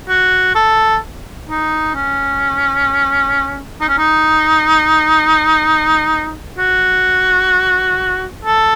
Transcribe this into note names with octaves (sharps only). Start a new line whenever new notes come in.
F#4
A4
D#4
C#4
D#4
C#4
D#4
F#4
A4